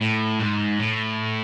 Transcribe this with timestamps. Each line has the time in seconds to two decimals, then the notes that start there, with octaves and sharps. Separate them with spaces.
0.01 A2
0.39 G#2
0.79 A2